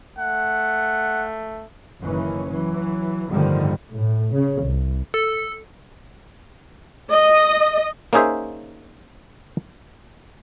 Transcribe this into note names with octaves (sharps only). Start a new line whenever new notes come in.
A3 F#5
F#1 D#3 E3 C#4
E3 F#3
G1 A2 D3 D#3 F3 G3
A2
C#3
C2
A4
D#5
A#3 C#4 D#4 G#4 C5 E5